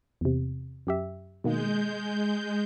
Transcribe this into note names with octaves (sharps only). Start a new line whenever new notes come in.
E2 C3
F#2 G4 E5
B2 D#3 G#3 A#3 G6